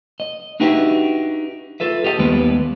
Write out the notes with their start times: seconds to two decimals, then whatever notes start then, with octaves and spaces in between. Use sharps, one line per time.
0.20 D#5
0.60 D4 D#4 F#4 G4 B4 E5
1.80 F4 A4 B4 E5
2.04 G4 D#5 F5 A5
2.19 D#2 G3 G#3 B3 B4